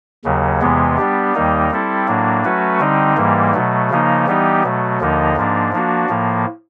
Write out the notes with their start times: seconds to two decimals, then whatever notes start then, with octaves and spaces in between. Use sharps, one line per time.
0.24 D#2 C#3 F#3
0.61 E2 C3 E3 G#3 B3
0.98 G3 B3 D4 G4
1.34 D#2 D#3 G3 A#3 D#4
1.71 G3 C4 E4 A4
2.07 A2 F#3 A#3 D4
2.44 F#3 A3 C#4 F#4 B4
2.80 D3 G3 C4 D#4
3.17 G#2 E3 G3 A#3
3.53 B2 F#3 A3
3.90 C#3 F3 A#3 D#4
4.27 E3 G3 B3 D#4 G4
4.63 B2 F#3 A3
5.00 D#2 D3 F3 A#3 D#4
5.37 G#2 F3 A#3 D4
5.73 F3 A#3 D4 F#4
6.09 A2 F3 A#3